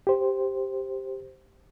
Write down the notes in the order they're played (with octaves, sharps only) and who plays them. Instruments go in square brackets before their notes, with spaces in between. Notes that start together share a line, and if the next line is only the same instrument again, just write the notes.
[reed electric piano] G4 C5